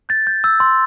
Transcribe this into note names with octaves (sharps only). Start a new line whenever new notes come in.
G6 A6
G6
E6
C6